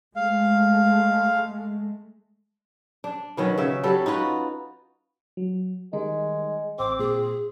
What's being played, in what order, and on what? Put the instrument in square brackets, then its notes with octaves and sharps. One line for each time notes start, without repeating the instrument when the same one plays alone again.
[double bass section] G#3 A3 [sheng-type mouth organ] F5
[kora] D4
B2 D#3 F#3 C#4
C#3 E5
F#3 G3 A4
D#4 F4 F#4 B4
[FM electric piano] F#3
[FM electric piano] D#3 G3 D#4 [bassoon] G#3
[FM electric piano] A1 [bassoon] C4 [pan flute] D6
[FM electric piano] A#2 [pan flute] G#4